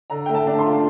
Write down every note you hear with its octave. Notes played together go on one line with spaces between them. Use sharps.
D3 A#5
A3 G5
A5
D4
C6
F4